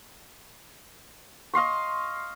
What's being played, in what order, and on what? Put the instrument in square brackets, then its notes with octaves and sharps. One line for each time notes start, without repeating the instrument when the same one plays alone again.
[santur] D#5 F5 C6 C#6